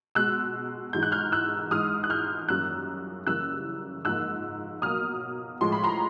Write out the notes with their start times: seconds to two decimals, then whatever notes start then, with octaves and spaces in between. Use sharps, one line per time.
0.15 B2 G#3 E6 F#6
0.93 G#2 E3 G#3 G6
1.03 F#6
1.12 F6 G6
1.32 E6 F#6
1.71 G#2 E3 G#3 D#6 F6
2.04 F#6
2.10 F6 G6
2.49 F#2 D#3 G3 A#3 E6 F#6
3.27 F#2 C#3 E3 G3 A#3 E6 F#6
4.05 G#2 F3 A#3 E6 F#6
4.82 B2 F#3 A#3 D#6 F6
5.61 A2 F3 G#3 C6
5.72 B5
5.84 A#5 C6